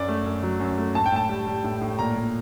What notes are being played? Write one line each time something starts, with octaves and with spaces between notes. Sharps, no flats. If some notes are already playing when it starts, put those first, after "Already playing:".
Already playing: F#2 D5
A3
F#2
F#3
F#2
A3
A2 A5
G5
A2 A5
G3
G3
A2
A2
A#2 A#5
A#2